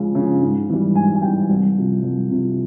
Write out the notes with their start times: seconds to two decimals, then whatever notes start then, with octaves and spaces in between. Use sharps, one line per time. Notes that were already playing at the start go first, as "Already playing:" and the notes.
Already playing: C#2 C#3 F3
0.15 C#3 F3
0.42 G#2
0.69 E3 G3
0.95 G#2 G#5
1.15 G#5
1.22 E3 G3 G5
1.49 C2
1.77 C3 F3
2.03 C2
2.31 C3 F3